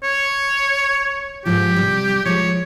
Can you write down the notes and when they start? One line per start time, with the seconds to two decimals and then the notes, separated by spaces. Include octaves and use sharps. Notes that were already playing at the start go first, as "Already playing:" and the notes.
0.03 C#5
1.45 G#2 F3 F4 G4
1.76 C3 G3
2.25 F3 G#3 C#5